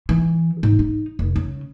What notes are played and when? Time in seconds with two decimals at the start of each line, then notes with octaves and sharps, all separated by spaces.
0.09 E3
0.63 G#2
0.79 D#4
1.19 F1
1.36 C#3